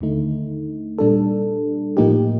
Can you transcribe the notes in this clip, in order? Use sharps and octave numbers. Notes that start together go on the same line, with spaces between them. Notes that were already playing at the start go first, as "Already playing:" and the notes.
D#2 D3 A3 D#4
A#2 G3 D4 A4
A2 F3 A#3 D#4 G4